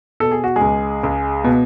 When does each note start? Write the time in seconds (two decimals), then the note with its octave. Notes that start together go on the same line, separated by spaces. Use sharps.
0.20 B2 A4
0.32 G#4
0.44 F#4
0.56 G#3 G#4
0.61 C#2
1.03 C#2
1.44 B2